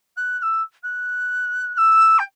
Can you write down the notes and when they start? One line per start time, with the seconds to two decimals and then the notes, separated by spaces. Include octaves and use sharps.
0.16 F#6
0.38 F#6
0.42 E6
0.83 F#6
1.74 F#6
1.77 E6
2.18 G5